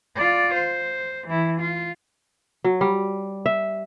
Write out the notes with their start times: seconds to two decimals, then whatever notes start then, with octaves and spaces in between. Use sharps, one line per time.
0.16 F4 D5
0.54 C5
1.27 E3 E4
1.60 F4
2.64 F#3
2.81 G3
3.46 E5